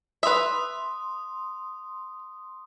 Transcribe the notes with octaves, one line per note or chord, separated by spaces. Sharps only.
B4 E5 C6 D#6